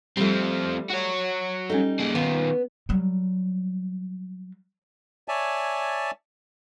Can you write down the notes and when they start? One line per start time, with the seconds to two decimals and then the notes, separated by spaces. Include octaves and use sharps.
0.17 F3 G3 A3 C4
0.90 F#4 C#5
1.70 G3 C#4 D#4 A4
1.99 A#3 G#4
2.15 D#3 B3 F4
2.89 F#3 G3
5.28 C#5 D5 E5 G#5 A5